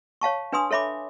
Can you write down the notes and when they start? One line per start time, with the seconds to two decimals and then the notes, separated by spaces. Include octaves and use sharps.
0.21 C#5 F5 A5 C#6
0.52 D4 B4 G#5 C6 D#6
0.71 A4 C#5 E5 B5 D6